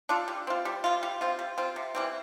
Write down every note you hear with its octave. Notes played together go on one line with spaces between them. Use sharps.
D4 F4 A4
G3
C4 F4
G3
C4 F4
G3
C4 F4
G3
C4 F4
C3
E3 G3 C4